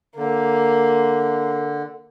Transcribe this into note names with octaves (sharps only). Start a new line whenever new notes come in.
D3 A#3